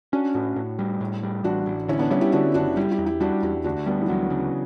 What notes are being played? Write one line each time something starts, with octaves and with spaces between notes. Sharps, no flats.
C#4 D4 F#4
A2 D4 F#4
A2
G3
A2
G3
A1 D4 F#4
A1
D3 C#4 E4
B3 D4
G3 C#4 E4
E4 G4
D3 D4 F#4
F#1 D4 F#4
G3 E4 G4
E4 G4
E2
E4 G4
G3 D4 F#4
E2 E4 G4
D2 D4 F#4
G3 B3 D4
E3
D2 F#3
C#3